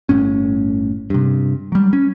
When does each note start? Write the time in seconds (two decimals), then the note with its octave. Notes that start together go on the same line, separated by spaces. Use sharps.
0.09 G1 A2 C#4
1.10 G2 C3
1.72 F#3 G3
1.93 C#4